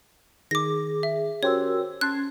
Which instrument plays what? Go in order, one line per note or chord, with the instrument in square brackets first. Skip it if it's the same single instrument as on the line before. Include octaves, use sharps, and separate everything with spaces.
[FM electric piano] D#3 [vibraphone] G#4 [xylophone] D6 A#6
[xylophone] E5
[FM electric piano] C#4 G4 C5 [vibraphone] F#4 A#4 E6 [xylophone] C#5
[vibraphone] C#4 [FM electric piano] A5 C6 G#6 [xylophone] F#6